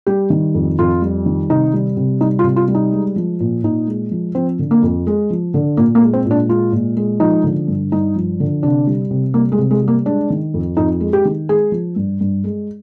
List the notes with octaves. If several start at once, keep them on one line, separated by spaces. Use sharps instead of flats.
G3 G4
D#3
F2
F2 F4
G3
D#3
C3 D#4
G3
C3
G3 D#4
F4
C3
F4
G3
D#4
G#3
F3
A#2
A#2 D#4
G#3
F3
F3 C4
D3
A#3
F2
G#3
F3
D3
A#2 A#3
A#3
G#3
C4
A#2
D4
G#3 F4
A#2
G#3
F3 D#4
D3
G2
G2 D#4
F3
D3
C3 D4
G3
C3
G3 A#3
G#3
C3
G#3
G3
A#3
G#3 D4
D#3
F2
F2 D#4
G#3
G4
D#3
G#3 G#4
F3
G2
G2
G#3